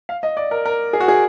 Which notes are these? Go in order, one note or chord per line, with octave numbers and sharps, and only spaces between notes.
F5
D#5
D5
A#4
A#4
G#4
F#4
G#4